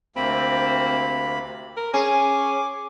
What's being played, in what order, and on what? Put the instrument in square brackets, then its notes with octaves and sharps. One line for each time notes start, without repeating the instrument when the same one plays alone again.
[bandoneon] D2 A#3 B5 [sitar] C3 [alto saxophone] C4
[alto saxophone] A#4
[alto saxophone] C#4 [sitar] G#4 [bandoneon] D6